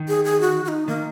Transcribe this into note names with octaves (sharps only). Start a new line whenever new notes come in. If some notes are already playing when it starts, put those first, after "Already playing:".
Already playing: D#3
G#4
G#4
F#4
F#4
D#4
D#3 A#3